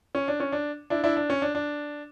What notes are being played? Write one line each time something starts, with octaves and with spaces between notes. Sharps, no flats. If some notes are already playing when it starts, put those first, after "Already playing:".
C#4
D4
C#4
D4
D4 E4
D4 E4
D4
C#4
D4
D4